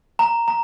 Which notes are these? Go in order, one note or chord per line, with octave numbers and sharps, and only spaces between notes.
A#5
A#5